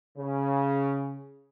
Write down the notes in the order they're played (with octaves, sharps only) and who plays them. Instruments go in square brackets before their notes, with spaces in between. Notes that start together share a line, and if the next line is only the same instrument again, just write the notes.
[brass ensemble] C#3